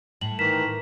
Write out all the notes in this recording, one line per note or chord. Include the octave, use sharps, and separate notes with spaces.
A2 F#7
D#3 E3 A#4 B6 E7